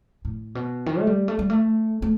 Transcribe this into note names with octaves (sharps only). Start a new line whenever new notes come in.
A2
B2
D#3
A3
G3
A3
G3
A3
A3